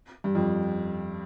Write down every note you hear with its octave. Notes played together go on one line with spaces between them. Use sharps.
G2
F2